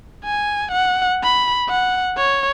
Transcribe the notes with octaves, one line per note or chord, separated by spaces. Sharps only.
G#5
F#5
B5
F#5
C#5